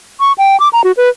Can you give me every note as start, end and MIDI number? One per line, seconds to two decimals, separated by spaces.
0.20 0.33 85
0.38 0.59 79
0.60 0.69 86
0.73 0.81 82
0.84 0.92 66
0.97 1.09 71